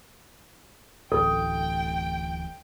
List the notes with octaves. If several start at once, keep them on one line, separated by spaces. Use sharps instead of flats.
D1 A1 A4 G5